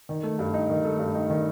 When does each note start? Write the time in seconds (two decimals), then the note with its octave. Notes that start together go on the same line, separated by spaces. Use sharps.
0.09 D#3
0.23 A3
0.39 G2
0.54 D#4
0.70 D#3
0.85 A3
0.99 G2
1.14 D#4
1.30 D#3